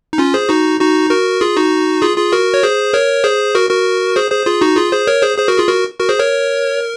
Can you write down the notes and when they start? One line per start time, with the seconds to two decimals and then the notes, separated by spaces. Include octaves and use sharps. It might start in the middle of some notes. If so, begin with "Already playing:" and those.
0.13 D#4
0.18 C#4 F4
0.34 G#4 C5
0.49 D#4 F#4
0.80 D#4 F#4
1.10 F#4 A#4
1.41 F4 G#4
1.57 D#4 F#4
2.02 F4 G#4
2.17 F4 G#4
2.32 F#4 A#4
2.54 C#5
2.63 G#4 C5
2.93 A#4 C#5
3.24 G#4 C5
3.55 F#4 A#4
3.70 F#4 A#4
4.16 G#4 C5
4.31 G#4 C5
4.46 F4 G#4
4.61 D#4 F#4
4.77 F4 G#4
4.92 G#4 C5
5.07 A#4 C#5
5.22 G#4 C5
5.38 G#4 C5
5.48 F#4 A#4
5.58 F4 G#4
5.68 F#4 A#4
5.99 F#4 A#4
6.09 G#4 C5
6.19 A#4 C#5